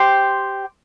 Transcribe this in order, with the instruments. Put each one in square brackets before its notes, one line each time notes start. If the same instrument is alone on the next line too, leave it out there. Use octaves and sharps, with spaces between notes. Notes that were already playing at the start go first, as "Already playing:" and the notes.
Already playing: [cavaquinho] G4 C5 G5 C6